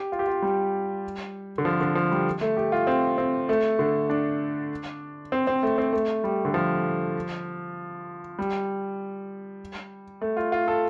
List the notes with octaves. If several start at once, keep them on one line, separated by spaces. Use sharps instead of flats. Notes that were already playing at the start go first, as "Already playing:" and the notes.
Already playing: G4
F4
G4
F4
G3
D3
F3
D3
F3
G3
A3
G4
F4
C4
C4
A3
D3
D4
C4
C4
A3
C4
A3
G3
D3
F3
G3
A3
F4
F4
A4